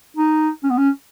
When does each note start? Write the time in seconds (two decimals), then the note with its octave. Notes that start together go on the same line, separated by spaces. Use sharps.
0.17 D#4
0.63 C#4
0.70 B3
0.78 C#4